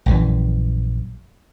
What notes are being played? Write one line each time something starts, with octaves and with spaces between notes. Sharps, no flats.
A#1 F#2 E3